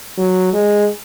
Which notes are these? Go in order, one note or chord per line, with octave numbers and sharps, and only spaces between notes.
F#3
G#3